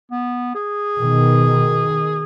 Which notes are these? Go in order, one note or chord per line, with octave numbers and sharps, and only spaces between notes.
B3
G#4
B2 D#3